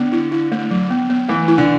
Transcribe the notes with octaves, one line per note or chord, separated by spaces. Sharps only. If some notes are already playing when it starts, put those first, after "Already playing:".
Already playing: D3 B3
E4
E4
A3
F#3
B3
B3
E3 A3
E4
D3